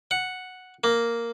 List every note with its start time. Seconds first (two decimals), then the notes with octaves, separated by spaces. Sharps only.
0.11 F#5
0.84 A#3